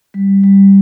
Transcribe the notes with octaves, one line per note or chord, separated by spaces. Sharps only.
G3
G3